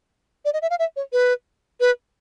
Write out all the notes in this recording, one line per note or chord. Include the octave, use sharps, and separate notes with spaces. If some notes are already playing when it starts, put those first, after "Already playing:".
D5
D#5
E5
F5
E5
C#5
B4
B4